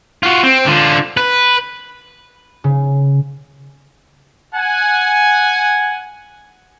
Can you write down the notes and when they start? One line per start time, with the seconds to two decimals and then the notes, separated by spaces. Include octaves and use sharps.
0.23 F4 F#4
0.43 C4
0.66 D3 F4
1.17 B4
2.64 C#3
4.55 F#5 G#5